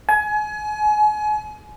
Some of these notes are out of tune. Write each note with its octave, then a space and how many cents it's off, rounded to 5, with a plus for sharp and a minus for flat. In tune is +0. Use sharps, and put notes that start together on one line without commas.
G#5 +30